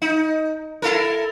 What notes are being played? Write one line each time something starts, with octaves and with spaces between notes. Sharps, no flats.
D#4
E4 A4 A#4